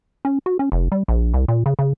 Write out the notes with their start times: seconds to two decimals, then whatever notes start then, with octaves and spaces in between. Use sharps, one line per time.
0.25 C#4
0.46 F#4
0.59 C#4
0.72 F1
0.92 G3
1.08 A#1
1.34 C2
1.48 A#2
1.66 C#3
1.79 C#3